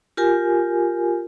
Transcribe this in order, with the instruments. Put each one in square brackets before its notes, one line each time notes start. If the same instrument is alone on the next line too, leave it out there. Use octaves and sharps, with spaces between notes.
[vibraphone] F4 G4 A#4 G#5